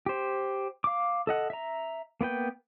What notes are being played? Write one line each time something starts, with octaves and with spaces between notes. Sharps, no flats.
G4 C5
F5 D6
A4 D#5 F#5
E5 A#5
A#3 B3 B4 G5